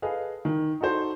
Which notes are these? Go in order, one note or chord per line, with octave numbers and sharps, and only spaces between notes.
G#4 A4 B4 D#5 F5
D#3
D#4 F#4 A4 C5